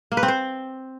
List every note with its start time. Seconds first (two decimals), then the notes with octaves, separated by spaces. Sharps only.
0.12 A#3
0.17 B4
0.23 C4
0.28 C5